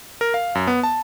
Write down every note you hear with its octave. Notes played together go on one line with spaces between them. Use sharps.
A#4
F5
F#2
B3
A5